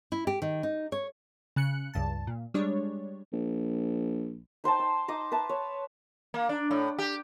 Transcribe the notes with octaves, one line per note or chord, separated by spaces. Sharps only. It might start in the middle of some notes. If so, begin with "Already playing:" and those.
E4
G4
D#3
D#4
C#5
C#3 F#6 C#7
C#2 G2 A5
A#2
G3 G#3 D4 C#5
A#1
D#4 C5 G5 A5
E6
D#4 D#5 D6
B4 E5 A5
C#5
A#3
D4
A2
G4